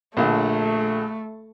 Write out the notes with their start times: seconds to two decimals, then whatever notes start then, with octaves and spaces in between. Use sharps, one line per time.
0.17 A#1 A#2 D3 A3